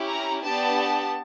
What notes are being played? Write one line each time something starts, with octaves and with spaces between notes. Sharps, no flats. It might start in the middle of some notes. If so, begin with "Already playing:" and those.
Already playing: C#4 E4 G4
A#5
B3 D4 G4 A5